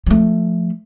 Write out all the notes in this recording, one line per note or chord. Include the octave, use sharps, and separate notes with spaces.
F3 A3